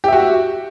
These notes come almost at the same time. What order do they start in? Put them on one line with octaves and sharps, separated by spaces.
G4 E5 F#4